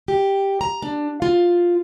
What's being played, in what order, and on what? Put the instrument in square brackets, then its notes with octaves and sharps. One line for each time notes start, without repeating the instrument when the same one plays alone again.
[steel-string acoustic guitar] G4
A#5
D4
F4